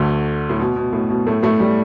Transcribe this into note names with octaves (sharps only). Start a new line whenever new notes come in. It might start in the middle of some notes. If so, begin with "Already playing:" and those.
Already playing: D2 D3
A2
B2
B2
A2
B2
A2 A3
A2 A3
G3